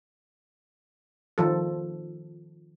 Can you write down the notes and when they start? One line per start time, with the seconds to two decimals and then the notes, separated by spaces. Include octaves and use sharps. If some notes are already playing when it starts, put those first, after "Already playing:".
1.38 D#3 F3 A4